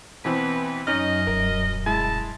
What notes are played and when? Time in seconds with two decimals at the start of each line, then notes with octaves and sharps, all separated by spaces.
0.25 B2 E3 C4 B4
0.87 F#2 C#4 D#4 D#5 F6
1.27 D#1 A#4
1.86 G#3 E4 A5